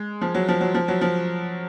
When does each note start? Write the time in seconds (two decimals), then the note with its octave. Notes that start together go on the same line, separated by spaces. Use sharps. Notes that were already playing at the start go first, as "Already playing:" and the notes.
Already playing: G#3
0.21 F3
0.34 F#3
0.48 F3
0.61 F#3
0.74 F3
0.88 F#3
1.01 F3